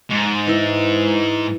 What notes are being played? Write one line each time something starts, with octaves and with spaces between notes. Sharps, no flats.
G#2
E3 E4